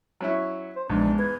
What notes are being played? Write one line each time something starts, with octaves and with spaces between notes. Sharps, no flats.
F#3 C#4 E4
C5
A#1 E2 G#2 G#3 D4
B4 G#6